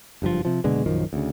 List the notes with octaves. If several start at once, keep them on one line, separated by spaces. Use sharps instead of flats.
F#1 G2 B2 F3
C3 F3
F#1 B2 D3 G#3
A#1 F#2 D#3 F3
D2 C#3